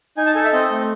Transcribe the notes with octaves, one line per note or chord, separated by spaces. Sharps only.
D#4 G#5
A5
A4 G#5
E5
C4 D#5
A3